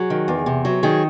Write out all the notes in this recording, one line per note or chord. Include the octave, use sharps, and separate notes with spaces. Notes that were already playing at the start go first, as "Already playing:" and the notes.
Already playing: F#3 G#4
D#3
E2
C3
F#3
D#3 G#4